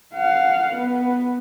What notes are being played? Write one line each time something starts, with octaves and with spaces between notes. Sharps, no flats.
F5 F#5
B3